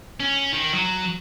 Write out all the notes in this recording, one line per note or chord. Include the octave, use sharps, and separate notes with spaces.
C#4
D#3
F#3